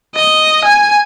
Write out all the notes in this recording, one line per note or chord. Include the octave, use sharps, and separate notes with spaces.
D#5
G#5